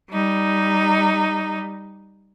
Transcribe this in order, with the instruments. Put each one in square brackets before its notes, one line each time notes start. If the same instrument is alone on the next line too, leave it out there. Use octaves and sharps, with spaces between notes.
[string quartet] G3 D#4